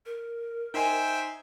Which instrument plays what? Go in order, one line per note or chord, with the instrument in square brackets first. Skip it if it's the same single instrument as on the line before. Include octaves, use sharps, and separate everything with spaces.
[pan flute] A#4
[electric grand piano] D#4 G#5 [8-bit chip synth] C5 E5 G5